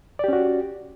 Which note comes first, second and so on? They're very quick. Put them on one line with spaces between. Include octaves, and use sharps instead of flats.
D5 G4 C#4 F#4